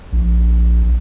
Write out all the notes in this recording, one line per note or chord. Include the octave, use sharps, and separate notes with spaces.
A#1